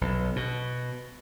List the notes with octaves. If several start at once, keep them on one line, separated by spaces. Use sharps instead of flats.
B1
B2